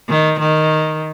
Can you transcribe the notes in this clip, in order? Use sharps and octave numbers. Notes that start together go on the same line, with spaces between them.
D#3
D#3